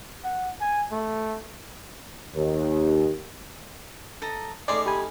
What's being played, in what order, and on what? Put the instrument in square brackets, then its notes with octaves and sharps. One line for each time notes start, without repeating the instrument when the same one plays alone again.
[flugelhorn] F#5
G#5
A3
[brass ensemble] D#2
[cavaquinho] A4 D#5 A#5
[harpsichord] A3 C#4 D#4 [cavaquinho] G#4 C6 [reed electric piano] D5 [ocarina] D6
[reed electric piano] G4 G#5 [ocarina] B5